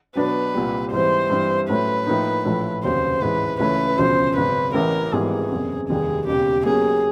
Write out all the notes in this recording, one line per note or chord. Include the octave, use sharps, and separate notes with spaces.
B2 F#3 B3 D4 B4
C2 A#2 G3
G#2 E3 G3 C4 C5
G2 E3 G3 C4
A2 F#3 A3 C#4 B4
A2 F3 A#3 D#4
A#1 A2 F3 A3
F1 D#2 C#3 F#3 C5
A1 G#2 E3 G#3 B4
C#2 C#3 E3 A3 C#4 B4
E1 D2 C#3 F3 C5
G#1 F#2 C#3 B4
A1 A2 E3 A#4
G#1 G#2 E3 G3 B3 G#4
F#1 E2 C3
F1 D#2 D#3 G3 G#4
E1 D#2 C#3 G4
B2 F#3 A#3 C#4 G#4